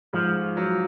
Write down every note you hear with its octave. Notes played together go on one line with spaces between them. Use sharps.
G#2 F3
F#3